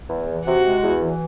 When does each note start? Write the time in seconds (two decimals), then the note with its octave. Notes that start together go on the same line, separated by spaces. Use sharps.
0.09 E2
0.28 E3
0.46 C3 F#4
0.64 G#3
0.82 E2
1.01 E3